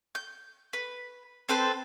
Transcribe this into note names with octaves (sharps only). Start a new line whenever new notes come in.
G6
B4
C4 A4 B4 C5